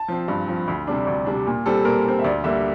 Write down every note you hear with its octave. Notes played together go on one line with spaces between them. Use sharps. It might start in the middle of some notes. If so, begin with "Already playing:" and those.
Already playing: A5
F3 C4
G2
F3 C4
D2
C3 G3 D4
D2
C3 G3 D4
A#2
G3 C4 A4
A#2 A#4
G3 C4
E5
D2 D5
D3 G3 A#3 E5